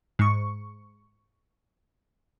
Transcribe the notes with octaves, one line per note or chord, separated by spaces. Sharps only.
G#2 C#6